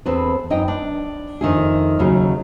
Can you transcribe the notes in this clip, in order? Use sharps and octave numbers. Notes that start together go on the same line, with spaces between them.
E2 C4 A4 B4
F#2 D#4 D#5 G5
D4
F2 D#3 A3 G#4
D#2 C#3 F#3 A3